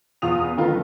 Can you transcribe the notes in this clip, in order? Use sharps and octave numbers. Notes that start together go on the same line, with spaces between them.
E2 F4 D#6 F7
B3
D3 D#3 A3 D#4 F4 B4
F#1